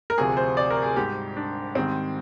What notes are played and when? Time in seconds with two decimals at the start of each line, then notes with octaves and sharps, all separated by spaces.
0.10 A#4
0.18 D2 C3 F3 G#4
0.37 C5
0.57 D5
0.71 A#4
0.83 G#4
0.96 G#2 G3 G4
1.36 D4
1.75 G#2 D#3 G3 C4